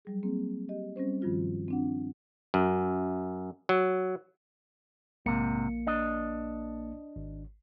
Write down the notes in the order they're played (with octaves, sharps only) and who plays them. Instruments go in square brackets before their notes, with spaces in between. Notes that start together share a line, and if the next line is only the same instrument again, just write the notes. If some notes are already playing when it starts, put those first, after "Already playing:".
[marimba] F#3 G3 G#4
A#3 C4 G#4
G4 D#5
G3 C4 C#4 C5
G2 D#3 F3 G3 F4 F#4
C4 D4 F#5
[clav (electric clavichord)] F#2
F#3
[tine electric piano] A#1 A#3 C#7 [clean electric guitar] G#2 C3
[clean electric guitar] D4 D#5
[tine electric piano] G#1